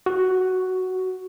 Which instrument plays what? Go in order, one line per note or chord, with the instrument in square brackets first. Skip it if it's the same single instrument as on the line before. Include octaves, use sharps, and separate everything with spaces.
[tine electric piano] F#4